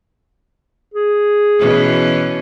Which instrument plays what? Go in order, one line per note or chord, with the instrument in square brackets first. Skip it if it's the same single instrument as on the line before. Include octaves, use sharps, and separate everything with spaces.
[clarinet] G#4
[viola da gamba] B2 E3 C#4